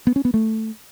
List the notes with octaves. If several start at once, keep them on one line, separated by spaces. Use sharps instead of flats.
B3
C#4
B3
A3